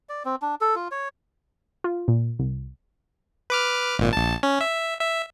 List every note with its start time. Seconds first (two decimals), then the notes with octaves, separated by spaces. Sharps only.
0.09 D5
0.25 C4
0.42 D4
0.61 A4
0.75 F4
0.91 C#5
1.84 F4
2.08 A#2
2.39 C2
3.50 B4 D6 F6
3.99 G#1 A#2
4.13 A#1 A5
4.43 C#4
4.61 E5
5.01 E5